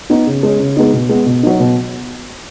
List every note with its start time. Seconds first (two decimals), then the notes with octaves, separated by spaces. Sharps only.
0.10 B3 D#4
0.27 C#3
0.43 G#3 C#4
0.60 C#3
0.77 G#3 B3 D#4
0.93 B2
1.09 G#3 B3
1.26 B2
1.43 F#3 D#4
1.60 B2